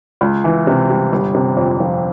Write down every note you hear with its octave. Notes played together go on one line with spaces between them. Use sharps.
C#2
E3
C3
G3
G1
C3
F2
F3